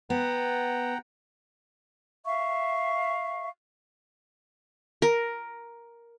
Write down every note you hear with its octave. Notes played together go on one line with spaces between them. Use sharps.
B3 F#5 G5 A#5
E5 F5 C#6
A#4